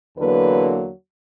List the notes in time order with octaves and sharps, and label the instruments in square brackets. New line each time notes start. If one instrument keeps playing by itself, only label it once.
[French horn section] E2 D3 F#3 A#3 B4